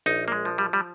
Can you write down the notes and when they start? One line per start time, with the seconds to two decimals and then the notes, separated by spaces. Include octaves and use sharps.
0.06 A#1 D#4
0.28 A#3
0.32 G#3
0.45 F3
0.58 G3
0.73 G3